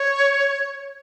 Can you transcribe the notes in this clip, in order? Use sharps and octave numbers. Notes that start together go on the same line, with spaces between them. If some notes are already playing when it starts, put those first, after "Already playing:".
Already playing: C#5